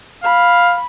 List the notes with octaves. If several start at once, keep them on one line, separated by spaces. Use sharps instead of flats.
F5 B5